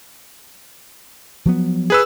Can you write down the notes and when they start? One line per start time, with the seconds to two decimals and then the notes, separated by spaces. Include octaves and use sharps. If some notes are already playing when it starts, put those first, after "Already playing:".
1.45 F3 F#3 B3
1.90 G#4 B4 E6